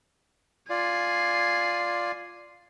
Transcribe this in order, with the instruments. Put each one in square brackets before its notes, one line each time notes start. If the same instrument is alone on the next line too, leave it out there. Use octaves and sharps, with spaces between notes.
[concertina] F4 D5 [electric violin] G#5 C7